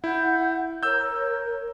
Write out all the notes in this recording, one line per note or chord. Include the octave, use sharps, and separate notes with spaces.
E4 F#5 G6
A#4 C#5 E6 G6